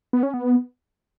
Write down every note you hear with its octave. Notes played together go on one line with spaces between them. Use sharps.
B3
C#4
B3